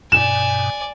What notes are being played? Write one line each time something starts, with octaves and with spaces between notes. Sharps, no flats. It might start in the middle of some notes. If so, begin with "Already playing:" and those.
G2 B2 D5 G#5 E7